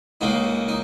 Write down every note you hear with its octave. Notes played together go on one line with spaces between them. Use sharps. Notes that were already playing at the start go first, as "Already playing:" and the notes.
C#2 C#3 A#3 D#4
D#4